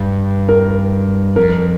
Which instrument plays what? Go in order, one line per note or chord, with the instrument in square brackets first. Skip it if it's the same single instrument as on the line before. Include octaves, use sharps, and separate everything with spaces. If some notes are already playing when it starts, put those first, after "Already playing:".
Already playing: [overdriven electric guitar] G2
[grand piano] A#4
[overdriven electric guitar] F2 [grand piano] A#4